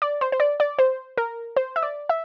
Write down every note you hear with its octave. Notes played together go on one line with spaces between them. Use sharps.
D5
C5
C5
D5
D5
C5
A#4
C5
E5
D5
E5